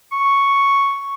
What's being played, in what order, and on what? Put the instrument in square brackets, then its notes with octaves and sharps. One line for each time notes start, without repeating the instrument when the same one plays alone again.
[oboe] C#6